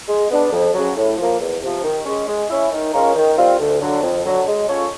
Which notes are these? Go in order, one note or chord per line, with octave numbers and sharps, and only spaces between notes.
G#3
B3 D4
F2
C#3 F#3
A2
F3 A#3
E2
C3 F3
D#3
G#3 C#4
G#3
C#4 E4
D#3
G#3 C#4 F4 A#4
D#3
G3 C4 F4
D2
D3 F#3
F2
D3 F#3
G#3
C#4 F4 A4 C#5